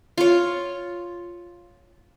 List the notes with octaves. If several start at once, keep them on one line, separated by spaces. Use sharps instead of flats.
F4 C#5